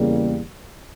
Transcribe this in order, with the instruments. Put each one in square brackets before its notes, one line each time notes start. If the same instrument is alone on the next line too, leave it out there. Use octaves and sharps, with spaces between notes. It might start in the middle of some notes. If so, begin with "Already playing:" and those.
Already playing: [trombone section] E2 C#3 G3 A#3